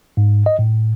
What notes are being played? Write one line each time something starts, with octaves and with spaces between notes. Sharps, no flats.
G#2
D#5
A2